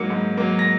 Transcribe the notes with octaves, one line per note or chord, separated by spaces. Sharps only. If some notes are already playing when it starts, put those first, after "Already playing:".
Already playing: G#2 F#3 A#3 C#7
G#2
F#3 A#3
A#6